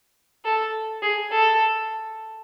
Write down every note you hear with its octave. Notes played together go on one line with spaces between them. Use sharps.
A4
G#4
A4